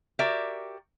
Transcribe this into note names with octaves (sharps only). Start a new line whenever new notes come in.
F#4 G4 A#4 D5 E5